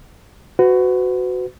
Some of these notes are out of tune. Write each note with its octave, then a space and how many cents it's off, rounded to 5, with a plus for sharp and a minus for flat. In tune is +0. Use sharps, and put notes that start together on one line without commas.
F#4 +0 B4 +35